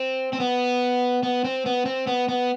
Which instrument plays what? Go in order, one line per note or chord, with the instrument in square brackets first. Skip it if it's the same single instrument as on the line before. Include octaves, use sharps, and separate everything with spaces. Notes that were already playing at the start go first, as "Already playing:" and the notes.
Already playing: [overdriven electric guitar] C4
C4
B3
B3
C4
B3
C4
B3
B3